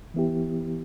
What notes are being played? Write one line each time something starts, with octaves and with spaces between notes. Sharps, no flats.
E3 B3 E4 G4